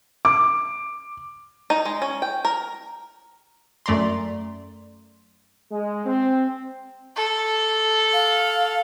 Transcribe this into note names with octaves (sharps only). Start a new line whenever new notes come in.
D6
D#4
G#3
C#4
G5
A#4
F#2 A3 D5 A#5 C6
G#3
C4
A4
F5